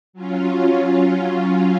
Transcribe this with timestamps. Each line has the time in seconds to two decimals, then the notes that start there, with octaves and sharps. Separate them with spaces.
0.13 F#3 C#4 F4